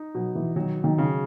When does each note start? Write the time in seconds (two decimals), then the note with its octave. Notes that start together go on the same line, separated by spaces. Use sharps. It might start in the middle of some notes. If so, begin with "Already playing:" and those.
Already playing: D#4
0.14 B2 F#3
0.35 E3
0.56 D#3 F#3
0.84 D#3
0.98 C#3